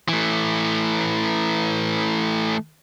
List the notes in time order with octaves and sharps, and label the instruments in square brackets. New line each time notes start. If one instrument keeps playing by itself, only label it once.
[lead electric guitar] E3 A3